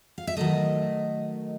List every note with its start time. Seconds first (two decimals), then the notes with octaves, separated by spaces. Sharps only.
0.18 F5
0.27 E5
0.37 D#3 F#3 A3 D#5